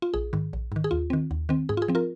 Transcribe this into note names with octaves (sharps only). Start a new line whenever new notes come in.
F4
A#1 G#4
G#2 D#3
A#1
G#2 D#3
G#4
D#2 F4
D#3 C4
D#2
D#3 C4
G#2 G#4
F4
G#4
F3 C4
F4 A#4